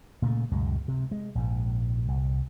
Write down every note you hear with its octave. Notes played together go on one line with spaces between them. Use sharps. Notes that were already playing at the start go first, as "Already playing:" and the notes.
A#2 C#3 G#3 A3
C#2 F#2 B2 G#3
C3
G#3
A#1 G#2
C2